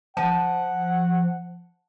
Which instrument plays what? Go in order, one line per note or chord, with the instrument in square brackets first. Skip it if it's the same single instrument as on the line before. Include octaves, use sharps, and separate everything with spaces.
[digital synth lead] F3 [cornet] F#5 [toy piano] A5